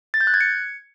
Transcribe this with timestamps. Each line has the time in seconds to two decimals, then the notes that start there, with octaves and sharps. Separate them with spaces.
0.14 A6
0.21 G6
0.27 F#6
0.34 G#6
0.41 C#7